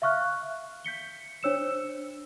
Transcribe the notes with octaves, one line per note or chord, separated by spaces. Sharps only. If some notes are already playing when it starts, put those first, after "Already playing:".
E5 F5 C#6 F6 F#6
G6 B6 C#7 G7
D4 C5 C#5 E6 C#7 E7